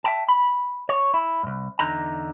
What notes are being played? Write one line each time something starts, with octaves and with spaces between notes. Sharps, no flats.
E5 G5 A5
B5
C#5
E4
C2 G2
E2 D3 D#4 A#5